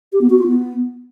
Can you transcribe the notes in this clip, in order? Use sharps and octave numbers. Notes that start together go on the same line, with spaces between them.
G4
B3
F#4
F4
B3